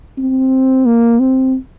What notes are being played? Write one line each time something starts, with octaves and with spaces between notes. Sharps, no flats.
C4
A#3
C4